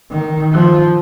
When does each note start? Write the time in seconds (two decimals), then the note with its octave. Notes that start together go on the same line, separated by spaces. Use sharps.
0.11 D#3
0.53 F3